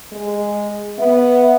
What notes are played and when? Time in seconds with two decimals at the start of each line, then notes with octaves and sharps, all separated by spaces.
0.12 G#3
0.99 B3 E5